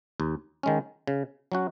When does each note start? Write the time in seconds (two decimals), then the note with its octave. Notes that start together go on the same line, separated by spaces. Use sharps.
0.20 D#2
0.63 D#3 G#3 C#4
1.07 C#3
1.52 F#3 C#4 F#4